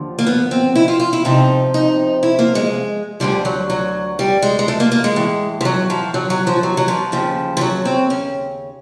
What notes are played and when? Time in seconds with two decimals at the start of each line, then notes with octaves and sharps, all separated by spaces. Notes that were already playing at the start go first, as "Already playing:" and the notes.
Already playing: D#2 D3 F3
0.19 A#3
0.27 B3
0.51 C4
0.75 E4
0.88 F4
1.00 F4
1.13 E4
1.25 F2 C3 F3 D#4
1.74 D#4
2.23 E4
2.39 A#3
2.55 G#3
3.20 D2 D3 F3 G3
3.45 F#3
3.70 F#3
4.19 G3
4.42 G#3
4.59 G#3
4.68 A3
4.80 A#3
4.92 A#3
5.04 G#3
5.16 A2 E3
5.61 F3
5.65 F#3
5.90 F3
6.14 F#3
6.30 F#3
6.47 F3
6.63 F#3
6.77 F#3
6.88 F3
7.12 D#2 C#3 F3
7.57 F3
7.61 F#3
7.85 C4
8.10 C#4